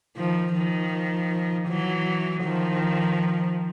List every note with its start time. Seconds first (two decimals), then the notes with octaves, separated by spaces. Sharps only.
0.17 D#3 F3
0.54 D#3 F3
1.68 E3 F#3
2.44 D#3 F3